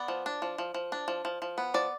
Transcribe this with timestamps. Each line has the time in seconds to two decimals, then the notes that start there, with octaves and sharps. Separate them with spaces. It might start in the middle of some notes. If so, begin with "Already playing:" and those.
Already playing: B3 D5
0.08 F3
0.26 D4
0.42 F3
0.58 F3
0.74 F3
0.92 D4
1.08 F3
1.25 F3
1.42 F3
1.58 B3
1.74 F3 D5